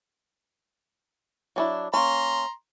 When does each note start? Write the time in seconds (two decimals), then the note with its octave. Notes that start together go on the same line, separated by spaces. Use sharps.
1.56 F#3 D4 E4
1.94 A#3 C#4 A#5 C6